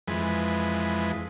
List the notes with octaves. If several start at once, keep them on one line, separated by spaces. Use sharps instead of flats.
F2 E3 G#3 B4